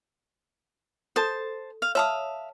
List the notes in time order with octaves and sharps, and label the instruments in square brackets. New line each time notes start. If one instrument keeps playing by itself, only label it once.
[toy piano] A4 [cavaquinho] C5 A5
[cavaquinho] F5
[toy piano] C#5 A5 [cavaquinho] E5 F5 D#6